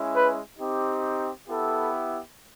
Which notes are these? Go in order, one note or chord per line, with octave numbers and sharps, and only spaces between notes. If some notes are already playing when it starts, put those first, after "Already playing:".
Already playing: G#3 C#4 E4
B4
C4 D#4 G4
B3 E4 G4 A4